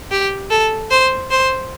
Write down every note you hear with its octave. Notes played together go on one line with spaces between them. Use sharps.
G4
A4
C5
C5